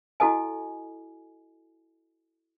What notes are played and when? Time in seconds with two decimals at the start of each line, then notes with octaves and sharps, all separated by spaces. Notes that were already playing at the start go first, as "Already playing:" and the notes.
0.20 E4 F#4 A4 D#5 G#5